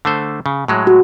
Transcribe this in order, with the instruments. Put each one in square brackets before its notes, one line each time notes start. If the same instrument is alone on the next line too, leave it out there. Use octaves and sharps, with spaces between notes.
[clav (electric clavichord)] D3 A3 C5
C#3
A2 F#3 G#3
[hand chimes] F#4